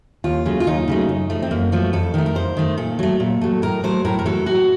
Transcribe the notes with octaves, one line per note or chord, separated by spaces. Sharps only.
D#2 F4
C#3 F#3 A3
F4
D#2 D#4
C#3 F#3 A3
F#2
F3 A3
C4
F#2 A#3
F3 A3 F#4
F2 A4
D#3 A3 A#4
A#4
F2 C5
D#3 A3
A#2 A4
F#3 A3
A#2
F#3 A3
A2 A#4
F#3 A3 C5
A2 A#4
A#4
F#3 A3 A4
A2 F#4